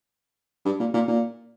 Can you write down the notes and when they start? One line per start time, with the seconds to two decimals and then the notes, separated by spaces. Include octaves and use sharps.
0.65 G2
0.79 A#2
0.94 A#2
1.07 A#2